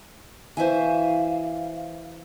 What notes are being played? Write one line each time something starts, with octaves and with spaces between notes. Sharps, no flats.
E3 F#4 C5 E5 F5 G#5